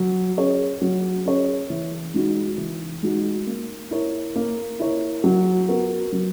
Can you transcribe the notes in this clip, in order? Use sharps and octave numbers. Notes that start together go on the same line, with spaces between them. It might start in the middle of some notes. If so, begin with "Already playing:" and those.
Already playing: F#3
C#4 G#4 C#5
F#3
C#4 G#4 C#5
E3
G#3 D#4 F#4
E3
G#3 D#4 F#4
A#3
E4 A#4 C#5
A#3
E4 A#4 C#5
F#3
B3 F#4 A#4
F#3